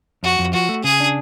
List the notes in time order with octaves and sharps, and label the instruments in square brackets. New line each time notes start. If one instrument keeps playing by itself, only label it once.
[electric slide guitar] F2 [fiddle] F#4
[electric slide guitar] F2
[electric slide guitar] F3 [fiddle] F#4
[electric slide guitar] A3
[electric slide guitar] C#3 [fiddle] G#4
[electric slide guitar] D4